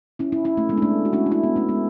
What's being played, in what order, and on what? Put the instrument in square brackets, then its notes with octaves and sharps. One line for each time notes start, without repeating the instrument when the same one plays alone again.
[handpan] C#4 E4
C#4 E4
C#4 E4
A3 C#4
G#3 B3
D4
A3 C#4
F#4
C#4 E4
D4
C#4 E4
B3 D4
A3 C#4
G#3 B3